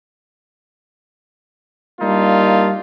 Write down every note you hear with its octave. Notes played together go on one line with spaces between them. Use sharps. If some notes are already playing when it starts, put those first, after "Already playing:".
G3 A#3 D4 D#4 F4